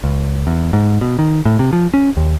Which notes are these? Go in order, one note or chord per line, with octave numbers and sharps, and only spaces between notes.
C#2
E2
G#2
B2
D#3
A2
C3
F3
C#4
D#2